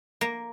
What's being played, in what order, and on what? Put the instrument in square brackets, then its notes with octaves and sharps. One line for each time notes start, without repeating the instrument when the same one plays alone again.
[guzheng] A#3